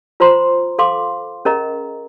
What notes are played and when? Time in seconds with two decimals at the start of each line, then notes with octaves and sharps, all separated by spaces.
0.20 F4 C5 A#5 C6
0.79 A4 F5 C6 D6
1.45 C#4 G#4 A#4 D#5 A#5